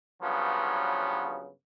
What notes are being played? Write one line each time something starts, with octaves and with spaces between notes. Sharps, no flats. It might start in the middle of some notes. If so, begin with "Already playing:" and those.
G2 C#3 F3 F#3 B3